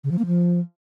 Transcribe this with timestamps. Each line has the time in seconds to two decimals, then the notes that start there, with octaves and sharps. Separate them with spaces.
0.04 C#3
0.11 F3
0.19 A#3
0.26 F3